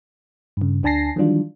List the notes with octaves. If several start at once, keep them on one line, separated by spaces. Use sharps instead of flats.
G2 C#3
D2 D4 G#5 A5 A#6 C7
D#3 E3 F#3 G3 D4 F4